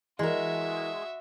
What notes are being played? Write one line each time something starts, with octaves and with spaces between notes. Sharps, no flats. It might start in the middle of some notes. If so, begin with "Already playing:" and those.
E3 G#3 F#4 A#4 E5